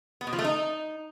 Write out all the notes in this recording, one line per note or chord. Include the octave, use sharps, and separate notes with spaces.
B3
B2
F3
A3
D#4